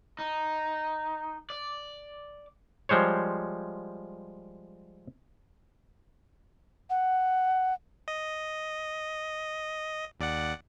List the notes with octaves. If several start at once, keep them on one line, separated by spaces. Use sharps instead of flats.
D#4
D5
F3 G3 G#3 C5 C#5
F#5
D#5
D#2 D5 F#5